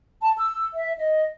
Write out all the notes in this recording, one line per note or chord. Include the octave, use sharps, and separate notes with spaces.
A5
E6
E5
D#5